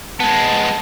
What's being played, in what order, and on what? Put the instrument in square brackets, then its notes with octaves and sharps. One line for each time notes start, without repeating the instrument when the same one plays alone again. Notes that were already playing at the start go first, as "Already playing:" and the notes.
[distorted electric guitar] G#3 B3 [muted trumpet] A5